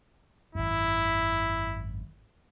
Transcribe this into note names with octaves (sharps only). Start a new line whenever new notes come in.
G#1 F#2 E4